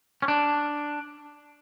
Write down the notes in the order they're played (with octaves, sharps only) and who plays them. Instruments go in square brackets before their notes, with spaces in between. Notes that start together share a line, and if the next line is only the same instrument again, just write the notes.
[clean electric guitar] C#4
D4